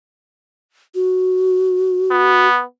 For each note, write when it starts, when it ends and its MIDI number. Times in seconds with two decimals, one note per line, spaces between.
0.95 2.47 66
2.11 2.62 59